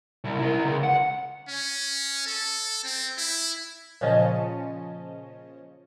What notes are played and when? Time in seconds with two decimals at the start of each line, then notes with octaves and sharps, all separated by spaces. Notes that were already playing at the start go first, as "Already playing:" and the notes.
0.24 C2
0.39 E4 A#4
0.64 C#2
0.84 F#5
1.49 C#4
2.26 A4
2.85 C4
3.18 E4
4.01 A#2 C#3 F3 C#4 D#5 A5